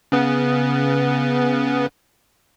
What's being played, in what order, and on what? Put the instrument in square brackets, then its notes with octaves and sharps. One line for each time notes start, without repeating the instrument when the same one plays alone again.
[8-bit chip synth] C#3 B3